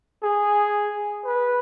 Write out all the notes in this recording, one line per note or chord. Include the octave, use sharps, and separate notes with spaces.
G#4
B4